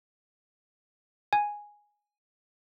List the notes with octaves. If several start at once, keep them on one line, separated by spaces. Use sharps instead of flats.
G#5